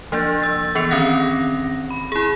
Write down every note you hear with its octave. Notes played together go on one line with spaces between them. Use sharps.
F3 A#3 D4 G6 A6
E6 A6
E3 B3 C7 C#7 F7
D#3 C4 C#4 F#5 F#6 A#6
B5
E4 G#4